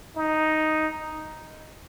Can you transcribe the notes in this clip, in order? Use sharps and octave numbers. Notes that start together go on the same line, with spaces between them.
D#4